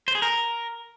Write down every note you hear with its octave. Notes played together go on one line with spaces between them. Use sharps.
C5
G#4
A#4